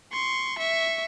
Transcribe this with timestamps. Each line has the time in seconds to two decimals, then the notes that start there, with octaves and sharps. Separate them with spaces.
0.12 C6 C#6
0.59 E5 C#6